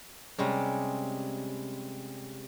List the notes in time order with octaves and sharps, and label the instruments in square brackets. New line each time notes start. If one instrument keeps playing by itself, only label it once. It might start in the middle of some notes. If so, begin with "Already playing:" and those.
[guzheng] C3 G3 G#3 C#4